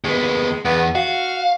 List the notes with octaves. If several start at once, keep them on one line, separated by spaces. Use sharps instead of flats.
D#2 G#3 B3
E2 B3
F#4 F5